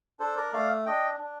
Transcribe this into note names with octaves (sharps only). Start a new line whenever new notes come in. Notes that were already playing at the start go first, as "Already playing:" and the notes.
D4 A4 C5
A#4 D5
A3 D5 F5
D4 D#5 G5
D4